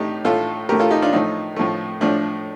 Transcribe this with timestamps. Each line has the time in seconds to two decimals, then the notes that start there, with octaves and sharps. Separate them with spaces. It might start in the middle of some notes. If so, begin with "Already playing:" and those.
Already playing: A2 A3 D#4 G4
0.25 A2 A3 F4 A4
0.69 A2 A3 G4 A#4
0.80 F4 A4
0.90 D#4 G4
1.02 D4 F4
1.13 A2 F3 A3 D#4
1.56 A2 F3 A3
2.01 A2 F3 A3 D4